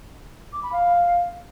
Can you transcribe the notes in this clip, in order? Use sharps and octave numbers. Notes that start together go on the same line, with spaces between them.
D6
B5
F5